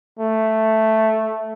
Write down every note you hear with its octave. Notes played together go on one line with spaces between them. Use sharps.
A3